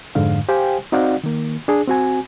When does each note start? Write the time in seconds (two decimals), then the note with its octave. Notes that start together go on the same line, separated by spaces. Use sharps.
0.15 F2 G#2 D3 F5
0.49 G4 C5 F5 G5 G#5
0.92 C4 D#4 F#4 D5 F5 F#5
1.24 D#3 A#3
1.68 D4 G#4
1.87 C4 F#4 G#5